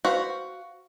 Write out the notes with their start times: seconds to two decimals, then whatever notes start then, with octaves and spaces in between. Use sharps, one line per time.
0.05 F#4 B4 C5 F5